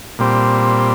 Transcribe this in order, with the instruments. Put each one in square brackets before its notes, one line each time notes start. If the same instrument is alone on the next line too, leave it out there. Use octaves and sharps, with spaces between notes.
[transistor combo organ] A#2 G3 C4